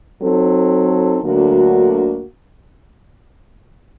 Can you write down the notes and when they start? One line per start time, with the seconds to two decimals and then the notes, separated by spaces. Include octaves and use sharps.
0.21 F#3 C4 D#4 A4
1.22 D2 D3 F#3 A#3 F#4